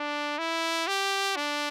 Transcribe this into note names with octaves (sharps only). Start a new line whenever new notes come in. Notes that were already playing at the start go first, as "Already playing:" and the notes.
Already playing: D4
E4
G4
D4